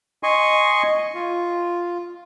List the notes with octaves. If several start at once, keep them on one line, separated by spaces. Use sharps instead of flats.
D#5 G#5 C6 C#6
F4